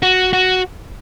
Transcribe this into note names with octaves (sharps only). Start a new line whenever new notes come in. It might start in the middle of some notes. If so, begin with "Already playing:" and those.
F#4
F#4